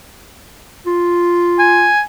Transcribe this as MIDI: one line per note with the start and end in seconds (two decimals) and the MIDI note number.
0.86 1.90 65
1.59 2.01 80